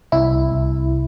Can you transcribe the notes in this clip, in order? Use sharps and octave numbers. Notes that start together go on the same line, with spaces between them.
C2 E4
C2